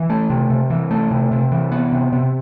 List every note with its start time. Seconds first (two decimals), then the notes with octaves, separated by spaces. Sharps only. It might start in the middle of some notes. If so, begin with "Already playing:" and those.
Already playing: E3
0.10 A3
0.30 C3
0.50 C3
0.70 E3
0.91 A3
1.11 C3
1.31 C3
1.52 E3
1.72 B3
1.92 C3
2.13 C3